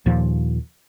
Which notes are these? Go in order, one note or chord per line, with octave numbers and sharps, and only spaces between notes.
D#2 A#2 F3